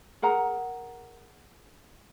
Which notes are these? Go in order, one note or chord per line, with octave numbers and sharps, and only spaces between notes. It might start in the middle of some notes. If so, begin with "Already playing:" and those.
G#4 A#4 F#5 A#5